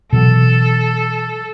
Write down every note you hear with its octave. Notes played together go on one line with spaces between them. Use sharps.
B2 E3 F#3 A4